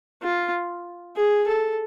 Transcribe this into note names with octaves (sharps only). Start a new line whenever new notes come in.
F4
G#4
A4